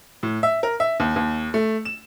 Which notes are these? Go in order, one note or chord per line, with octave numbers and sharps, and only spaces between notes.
A2
E5
A#4
E5
D#2
D#2
A3
E7